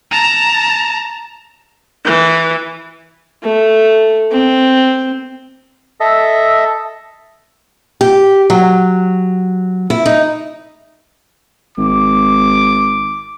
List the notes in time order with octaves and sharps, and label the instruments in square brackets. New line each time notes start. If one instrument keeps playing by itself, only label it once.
[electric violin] A5 A#5
[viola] E3
[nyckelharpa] A3
C4
[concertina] A4 D#5 E5
[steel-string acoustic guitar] G4
F#3
E4
D#4
[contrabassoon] G#1 [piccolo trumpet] D6